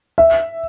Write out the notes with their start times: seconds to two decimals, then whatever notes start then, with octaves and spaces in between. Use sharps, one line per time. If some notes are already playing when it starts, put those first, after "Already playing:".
0.18 E5